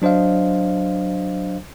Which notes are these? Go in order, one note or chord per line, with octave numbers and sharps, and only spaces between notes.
F#3 D4 C5 D#5 F5